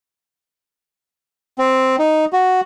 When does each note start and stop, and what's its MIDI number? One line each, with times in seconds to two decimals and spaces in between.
1.58 1.96 60
1.99 2.25 63
2.33 2.61 66